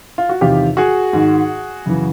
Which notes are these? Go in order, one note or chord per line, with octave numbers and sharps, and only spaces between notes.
F4
F#4
E2 C3 D#3 F4 G4
F#4 G#4
G#2 D#3
F#2 C#3 E3